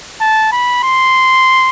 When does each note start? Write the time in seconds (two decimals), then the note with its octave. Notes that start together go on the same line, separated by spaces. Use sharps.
0.21 A5
0.52 B5
0.84 C6